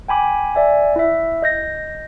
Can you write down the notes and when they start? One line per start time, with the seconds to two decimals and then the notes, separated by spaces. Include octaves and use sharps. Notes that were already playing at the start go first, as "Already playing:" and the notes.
0.08 G5 G#5 B5 D6
0.55 D5 E5 G#5
0.96 E4 E5
1.42 D#5 G6 A#6